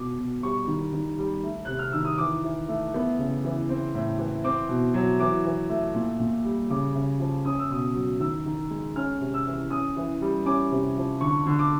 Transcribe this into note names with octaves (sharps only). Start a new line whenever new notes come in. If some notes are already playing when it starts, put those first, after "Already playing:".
Already playing: B2 D6
B2
G3 C#6
D#3
D#3
G3
A3
C3 F#6
F6
D#3 E6
D#6
E3 D6
E3
A3
B3
C#3
E3
C4
A2
E3
C4 D6
B2
F#3
E3 D6
E3
A3
A#2
A#2
G3
C#3 D6
C#3
F3
C#4 D#6
E6
B2 D#6
F#3
D#3 E6
D#3
G#3
C#4 F6
C3
E6
E3
C#4 D#6
E3
G3
C#4 D6
C3
F3
D3 C#6
D3
D6